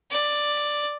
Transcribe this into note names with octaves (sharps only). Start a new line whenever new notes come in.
D5